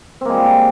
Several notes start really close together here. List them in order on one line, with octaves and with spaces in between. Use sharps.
C4 A#3 G#3 G3